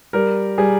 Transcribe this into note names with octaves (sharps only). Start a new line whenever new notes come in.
G3 A#4
G3 G#4